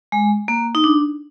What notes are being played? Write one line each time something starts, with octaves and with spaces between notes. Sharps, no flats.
G#3
A#3
D#4
D4